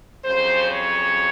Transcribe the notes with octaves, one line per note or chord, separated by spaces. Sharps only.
F2 C#3 F#3 C5
C#5